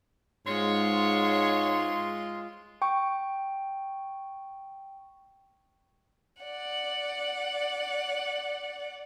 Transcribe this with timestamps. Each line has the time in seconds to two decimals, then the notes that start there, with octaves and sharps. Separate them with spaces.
0.47 G#2 G#3 F4 C#5 C6
2.82 G5 C#6
6.43 D5 F#5